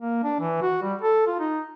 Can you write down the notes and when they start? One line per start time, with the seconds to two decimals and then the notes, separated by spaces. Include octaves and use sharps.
0.01 A#3
0.24 D4
0.40 E3
0.62 F#4
0.82 G3
1.02 A4
1.27 F4
1.40 D#4